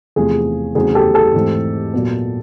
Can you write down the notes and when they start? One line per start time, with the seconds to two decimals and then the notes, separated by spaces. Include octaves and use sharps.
0.16 E2 C3 F3 A3 G#4
0.75 E2 C#3 F#3 A3 C4 G#4
0.95 G4 A4
1.14 G4 A4
1.34 G#2 E3 A3 C4
1.93 A#2 F#3 B3